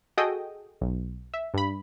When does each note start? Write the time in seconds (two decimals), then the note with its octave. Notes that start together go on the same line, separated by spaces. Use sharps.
0.17 F#4 G#4 A4 D#5 G5 D#6
0.81 B1
1.34 E5
1.54 G2 B5